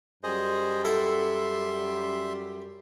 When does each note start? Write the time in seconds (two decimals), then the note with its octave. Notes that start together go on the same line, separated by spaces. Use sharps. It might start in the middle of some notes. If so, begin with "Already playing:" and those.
0.23 F#2 G3 G#4 C5 D#5
0.85 E4 A4 E5 F#5 C6